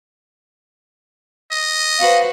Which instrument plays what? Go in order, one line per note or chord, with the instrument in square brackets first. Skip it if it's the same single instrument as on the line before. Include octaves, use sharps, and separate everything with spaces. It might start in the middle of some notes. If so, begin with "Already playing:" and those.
[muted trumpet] D#5
[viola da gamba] F#4 B4 C5 [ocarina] F5